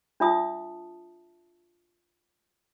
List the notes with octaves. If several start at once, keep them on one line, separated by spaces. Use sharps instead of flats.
D4 F4 E5 A5 D#6